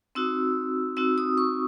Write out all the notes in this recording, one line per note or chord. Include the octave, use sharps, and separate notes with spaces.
C4 D#4 F#4 E6
C4 D#4 F#4 E6
D#6
C#6